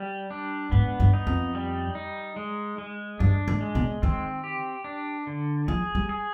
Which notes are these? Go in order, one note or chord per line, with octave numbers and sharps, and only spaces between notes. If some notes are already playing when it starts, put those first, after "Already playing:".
Already playing: G3
D4
G#2 B3
G2
D#4
F2
G3
D#4
G#3
G#3
G2 D4
G#2
G#3
B2
D#3 C4
G4
D4
D3
F3 G#4
G3
G#4